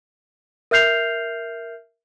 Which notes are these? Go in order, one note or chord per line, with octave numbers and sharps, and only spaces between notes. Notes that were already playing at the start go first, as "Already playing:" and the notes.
A#4 E5 F6 G6 C7 F7